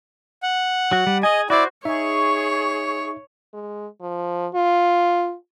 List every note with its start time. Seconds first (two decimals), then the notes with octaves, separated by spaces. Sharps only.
0.43 F#5
0.91 F#3 F#4
1.07 G3
1.23 G#4 D#5 G#5
1.50 E4 F#4 C5 D5
1.85 D#4 G#4 C#5 E5 C#6
3.53 G#3
4.01 F3
4.54 F4